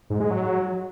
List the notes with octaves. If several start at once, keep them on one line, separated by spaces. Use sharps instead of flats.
G#2
G#3
F#3